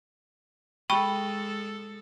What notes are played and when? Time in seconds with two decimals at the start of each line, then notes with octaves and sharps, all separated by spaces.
0.90 G#3 A4 G5 B5 C#6